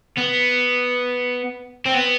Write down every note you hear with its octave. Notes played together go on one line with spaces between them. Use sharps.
B3
C4
B3